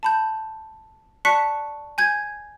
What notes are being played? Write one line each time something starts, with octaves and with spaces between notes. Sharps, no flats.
A5 B5 G6
D5 A5 C#6 F#6 B6 C#7
G#5 G6 G#6